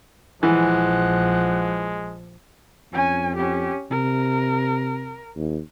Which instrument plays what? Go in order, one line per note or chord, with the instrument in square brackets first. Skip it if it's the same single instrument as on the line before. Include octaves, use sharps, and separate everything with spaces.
[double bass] A#1 F3 [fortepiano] E3 [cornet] G#3 [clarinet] F#5
[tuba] F2 [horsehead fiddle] C#4 G#5
[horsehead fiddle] C#4 G4
[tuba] C3 [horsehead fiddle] A#4
[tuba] D#2